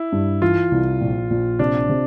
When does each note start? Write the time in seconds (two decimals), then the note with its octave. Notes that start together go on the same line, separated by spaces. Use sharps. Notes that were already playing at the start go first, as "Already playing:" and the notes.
Already playing: E4
0.12 G2
0.42 E3 F4
0.71 C2
1.01 A#1
1.30 A#1
1.59 C3 D4
1.89 C3